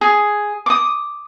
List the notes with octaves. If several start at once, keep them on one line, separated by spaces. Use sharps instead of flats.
G#4
D6 D#6